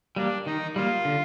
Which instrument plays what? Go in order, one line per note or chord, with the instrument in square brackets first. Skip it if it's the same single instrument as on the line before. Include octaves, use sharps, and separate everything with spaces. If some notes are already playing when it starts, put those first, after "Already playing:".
[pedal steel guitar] G3 A#3 [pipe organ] D4
[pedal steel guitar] D#3 [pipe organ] D#4
[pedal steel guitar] G3 A#3 [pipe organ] F4
[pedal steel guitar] D3